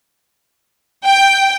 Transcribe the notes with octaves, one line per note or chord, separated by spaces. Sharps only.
G5